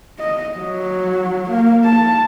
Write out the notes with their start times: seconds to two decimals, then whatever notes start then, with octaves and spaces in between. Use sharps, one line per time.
0.19 D#5
0.58 F#3
1.50 A#3
1.84 A5